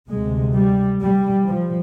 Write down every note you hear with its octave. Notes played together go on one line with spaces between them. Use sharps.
D2 C3 G#3
G3
G3
F3